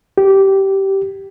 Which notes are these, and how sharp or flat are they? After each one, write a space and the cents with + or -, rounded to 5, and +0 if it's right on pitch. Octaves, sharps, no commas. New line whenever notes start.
G4 -15